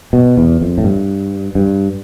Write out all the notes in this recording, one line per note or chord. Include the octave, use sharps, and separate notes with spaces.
B2
E2
F2
A2
G2
G2